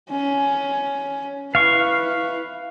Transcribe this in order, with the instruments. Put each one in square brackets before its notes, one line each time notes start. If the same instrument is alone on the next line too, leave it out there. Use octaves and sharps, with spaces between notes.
[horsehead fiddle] C#4
[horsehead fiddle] E4 B4 [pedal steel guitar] F5 C#6